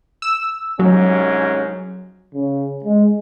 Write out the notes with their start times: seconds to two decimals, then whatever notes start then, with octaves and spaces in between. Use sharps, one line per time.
0.22 E6
0.79 C2 G#2 F#3 C#4
2.35 C#3
2.85 G#3